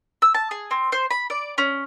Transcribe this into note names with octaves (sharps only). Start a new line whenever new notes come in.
E6
A5
G#4
C4
C5
B5
D5
C#4